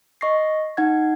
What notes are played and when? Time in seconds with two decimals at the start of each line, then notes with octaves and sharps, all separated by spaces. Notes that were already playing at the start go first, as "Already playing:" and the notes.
0.21 D#5 C#6 A#6 C7
0.77 D#4 F#5 G#6